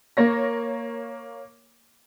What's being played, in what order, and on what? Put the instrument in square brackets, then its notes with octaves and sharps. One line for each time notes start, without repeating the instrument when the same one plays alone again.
[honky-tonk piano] A#3 C#5 A#6